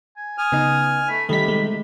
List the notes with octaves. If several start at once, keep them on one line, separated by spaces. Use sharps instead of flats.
G#5
G#5 D#6 F6
C#3 B3 D#4
A3 B5
C3 D#3 G3 A3 D#4 B5 B6
G#3 A3